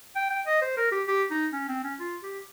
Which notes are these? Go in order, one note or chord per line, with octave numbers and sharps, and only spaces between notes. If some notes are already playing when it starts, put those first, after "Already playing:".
G5
G5
D#5
C5
A#4
G4
G4
D#4
C#4
C4
C#4
F4
G4